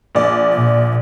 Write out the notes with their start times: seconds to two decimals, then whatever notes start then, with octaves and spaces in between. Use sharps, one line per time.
0.15 A#1 D5
0.53 A#2